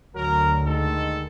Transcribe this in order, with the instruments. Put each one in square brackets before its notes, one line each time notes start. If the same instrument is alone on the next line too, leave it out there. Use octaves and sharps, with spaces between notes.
[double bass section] D2 [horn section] F#3 A#4
[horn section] D#3 G#3 A4